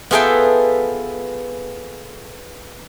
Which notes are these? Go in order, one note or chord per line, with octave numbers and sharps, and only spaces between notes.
B3 F4 G#4 A4 E5 G5